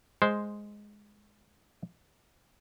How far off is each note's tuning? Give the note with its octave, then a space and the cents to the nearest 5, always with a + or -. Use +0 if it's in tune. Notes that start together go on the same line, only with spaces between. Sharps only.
G#3 +0 C5 +0